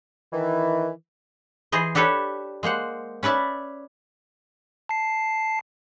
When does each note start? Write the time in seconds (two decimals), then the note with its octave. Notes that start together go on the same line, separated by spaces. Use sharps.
0.33 D#3 E3
1.72 E3 G#4 C5 D#5
1.95 D4 G4 A4 B4 C#5
2.63 G#3 A#3 C5 F#5
3.23 C#4 B4 D5 E5 A5
4.89 A5 C7